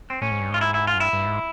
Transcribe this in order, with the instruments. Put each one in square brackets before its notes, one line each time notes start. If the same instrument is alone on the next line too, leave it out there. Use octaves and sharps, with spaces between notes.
[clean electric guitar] C4
[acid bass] A2 [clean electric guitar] C#4
[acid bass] G#2
G2
[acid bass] G#2 [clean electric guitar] F4
[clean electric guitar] E4
E4
F4
[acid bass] F#2
[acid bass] G2 [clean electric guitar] E4
[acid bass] G2
G#2